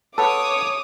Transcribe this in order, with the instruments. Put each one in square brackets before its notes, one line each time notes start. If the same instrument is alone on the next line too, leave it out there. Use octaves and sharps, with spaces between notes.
[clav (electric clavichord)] A4 B4 F#5 [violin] C#5 [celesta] A5 [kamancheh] D6 D#6